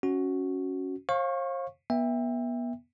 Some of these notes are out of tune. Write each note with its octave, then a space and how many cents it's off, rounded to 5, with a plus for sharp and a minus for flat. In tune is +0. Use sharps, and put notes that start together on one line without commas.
C#4 +0 F#4 +0
C5 +45 F5 +10 C#6 -20
B3 -30 E5 +0 G5 +30